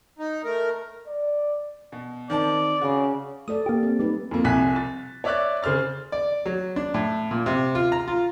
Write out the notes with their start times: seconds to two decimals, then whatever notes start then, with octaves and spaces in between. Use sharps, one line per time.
0.19 D#4
0.44 A3 A#4
1.07 D5
1.92 B2
2.30 D#3 C4 D5 A5
2.81 C#3 F#4
3.48 A3 A4 D5 D#6
3.66 A#3 G4
3.83 C4
3.99 G3 D#4 B4
4.31 F2 A#3
4.44 C2 F2 G#5 F#6 B6
4.76 A6
5.24 C#5 D5 E5 D6 F#6 A6
5.63 C#3 G#4 C5 F6 A6
6.12 D5
6.46 F#3
6.76 D4
6.94 A2
7.31 A#2
7.46 C3
7.75 F4
7.92 A#5
8.08 F4